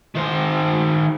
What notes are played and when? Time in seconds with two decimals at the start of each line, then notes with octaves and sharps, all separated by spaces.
0.15 D#3 C5